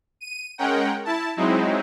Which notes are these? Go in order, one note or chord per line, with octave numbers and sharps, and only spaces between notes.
D#7
G#3 C#4 A#4 F#5 G5
E4 A5
F#3 G#3 C4 D#4 E4